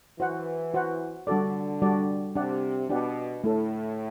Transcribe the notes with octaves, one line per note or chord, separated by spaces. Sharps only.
E3 F#4 C5 F#5
F#4 C5 F#5
D3 G3 D4 F#4 A4 D5
G3 D4 F#4 A4 D5
C3 D4 G4 D5 F#5
B2 D4 G4 D5 F#5
A2 A3 E4 A4